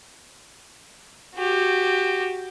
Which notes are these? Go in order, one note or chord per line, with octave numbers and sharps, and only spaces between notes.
F#4 G4